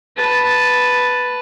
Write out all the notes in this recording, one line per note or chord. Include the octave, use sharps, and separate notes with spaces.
B4 A5